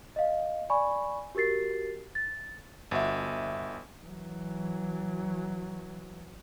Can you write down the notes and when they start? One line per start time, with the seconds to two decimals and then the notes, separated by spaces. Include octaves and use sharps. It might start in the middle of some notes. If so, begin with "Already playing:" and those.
0.16 D#5 F5
0.70 D5 G#5 B5 C#6
1.35 F#4 G4 A#4 A6 C7
2.15 A6
2.91 G1 F#4 E5
4.03 E3 F#3